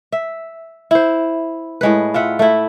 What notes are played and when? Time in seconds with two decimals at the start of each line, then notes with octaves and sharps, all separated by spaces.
0.12 E5
0.91 E4 C5
1.81 A2 G#3 B4
2.14 F4 E5 F#5
2.39 A3 E4